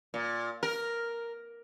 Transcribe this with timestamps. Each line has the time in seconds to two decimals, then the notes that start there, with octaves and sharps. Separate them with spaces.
0.14 A#2
0.63 A#4